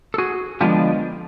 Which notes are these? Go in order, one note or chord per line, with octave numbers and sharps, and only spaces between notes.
A4
F#4 G#4
D3 F3 G#3 B3 D4 F4 G4